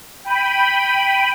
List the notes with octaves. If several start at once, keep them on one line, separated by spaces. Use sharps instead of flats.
G5 B5 D#7